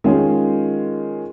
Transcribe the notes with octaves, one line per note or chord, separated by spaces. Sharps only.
D#3 G#3 C#4 F4 G#4